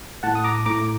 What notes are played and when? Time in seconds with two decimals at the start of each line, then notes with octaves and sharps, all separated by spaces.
0.23 A2 F#5 A5
0.35 D#6
0.44 A#5 D6
0.66 A2 A#5 D6